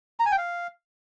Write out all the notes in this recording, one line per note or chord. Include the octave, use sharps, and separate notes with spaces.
A#5
G#5
G5
F5